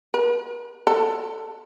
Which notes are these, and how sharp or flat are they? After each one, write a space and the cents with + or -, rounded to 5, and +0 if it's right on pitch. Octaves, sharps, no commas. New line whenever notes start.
A#4 +45
A4 +5